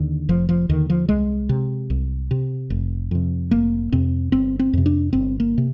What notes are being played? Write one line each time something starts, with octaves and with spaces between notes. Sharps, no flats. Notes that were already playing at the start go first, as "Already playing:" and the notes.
Already playing: D#2 D3 D#3
F1 F3
F3
D#2 D3 D#3
F3
C2 G#3
C3
C2
C3
F1
F2 C3
F1 A#3
F2 C3 C4
G1 C4
C4
F2 C3
D4
G1 C4
A#3
C3